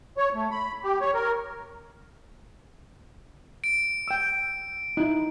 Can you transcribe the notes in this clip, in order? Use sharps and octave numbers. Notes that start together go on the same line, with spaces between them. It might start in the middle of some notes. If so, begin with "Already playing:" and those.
C#5
A3
B5
G4
C#5
A#4
D7
G5 E6
D#4 E4